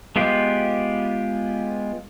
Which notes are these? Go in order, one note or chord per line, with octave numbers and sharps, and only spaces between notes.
G#3 B3 F4 G4